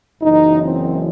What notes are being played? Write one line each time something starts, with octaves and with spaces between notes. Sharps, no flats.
F#1 F#2 E3 D#4
C4